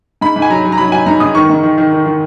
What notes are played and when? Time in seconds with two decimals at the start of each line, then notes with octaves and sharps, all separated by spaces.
0.21 G#2 B5
0.36 G#2
0.42 G#5
0.50 F#3 A#5
0.64 F#3
0.72 A#5
0.78 F#3 B5
0.92 F#3 G#5
1.06 G#2 A#5
1.20 G#2 D#6
1.35 D#3 C#6
1.50 G#2
1.63 D#3
1.78 D#3
1.92 D#3
2.05 D#3